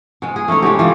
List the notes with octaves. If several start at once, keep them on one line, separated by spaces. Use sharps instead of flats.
B2 G#3
G#4
A3 C#4 D#4 C#5
E3 G#3 B3 G4
E3 G3 A3 F4